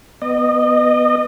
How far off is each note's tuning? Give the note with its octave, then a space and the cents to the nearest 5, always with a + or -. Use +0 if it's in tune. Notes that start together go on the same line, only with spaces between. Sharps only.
B3 +0 D#5 -25